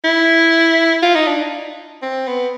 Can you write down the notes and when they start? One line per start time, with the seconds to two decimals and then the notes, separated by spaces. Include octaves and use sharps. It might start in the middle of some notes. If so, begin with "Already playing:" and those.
0.04 E4
1.02 F4
1.15 D#4
1.27 D4
2.02 C4
2.27 B3